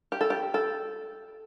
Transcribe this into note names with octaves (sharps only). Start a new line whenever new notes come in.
G4
A4
G4
A4